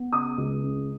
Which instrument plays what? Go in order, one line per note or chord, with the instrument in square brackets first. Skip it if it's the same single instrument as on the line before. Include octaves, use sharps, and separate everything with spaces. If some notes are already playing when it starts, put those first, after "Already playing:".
Already playing: [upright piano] B3
C#3 D#6
C#2
C#3